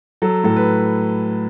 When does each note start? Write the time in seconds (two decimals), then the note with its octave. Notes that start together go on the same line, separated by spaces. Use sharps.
0.22 F#3 A4
0.44 A2 A4
0.56 B4